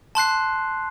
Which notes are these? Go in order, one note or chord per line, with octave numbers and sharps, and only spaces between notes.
A5 C6 F#6 C7